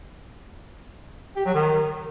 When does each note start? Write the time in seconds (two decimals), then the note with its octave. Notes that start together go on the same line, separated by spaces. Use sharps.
1.36 G4
1.45 F#3
1.54 D#3